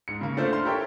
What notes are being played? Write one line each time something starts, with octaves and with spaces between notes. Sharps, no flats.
G#2 C#7
C#3 A#3
A3 D4 F4 C5 E5
C6 F6
G4 A4 A#4 C#5 E5 G5